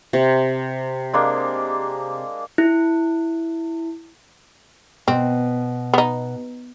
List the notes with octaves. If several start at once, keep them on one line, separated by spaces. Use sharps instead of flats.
C3
G#3 A#3 D4
E4
B2 C4
B3 D#4